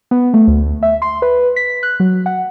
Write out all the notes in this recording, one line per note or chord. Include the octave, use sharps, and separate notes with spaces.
B3
A3
D2
E5
C6
B4
B6
F#6
F#3
F#5